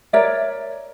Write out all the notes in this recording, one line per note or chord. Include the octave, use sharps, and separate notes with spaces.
A#4 C#5 D5 E5